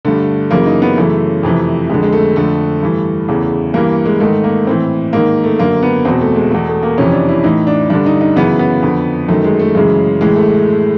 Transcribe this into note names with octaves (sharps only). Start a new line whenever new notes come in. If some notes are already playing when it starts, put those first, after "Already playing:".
G2 D3 A3
F#2 C#3 E3 A#3
D#4
B3
F#2 C#3 E3 A3
F2 C3 E3
F2 D3 G#3
G#3
A3
F2 D3 A3
G2 E3
E2 C#3 E3
G2 E3 A#3
G#3
G#2 D#3 A3
A#3
A2 E3 C4
G#2 D#3 A#3
A3
F#2 D3 A#3
B3
E2 B2 C4
A3
G#3
E2 B2 A3
A3
A#3
F2 C3 E3 C#4
D4
E4
A2 E3 D#4
D4
G2 D3 D4
D#4
D#4
F#2 C#3 E3 B3
B3
F2 D3
F#2 D#3 A3
G#3
A3
F#2 C#3 E3 G#3
A2 E3 G#3
A3